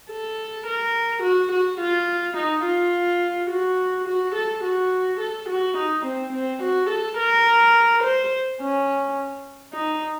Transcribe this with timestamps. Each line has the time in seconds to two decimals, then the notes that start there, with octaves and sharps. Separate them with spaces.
0.10 A4
0.67 A#4
1.23 F#4
1.52 F#4
1.80 F4
2.37 D#4
2.64 F4
3.50 F#4
4.07 F#4
4.35 A4
4.64 F#4
5.20 A4
5.49 F#4
5.77 D#4
6.05 C4
6.33 C4
6.63 F#4
6.90 A4
7.19 A#4
8.03 C5
8.61 C#4
9.73 D#4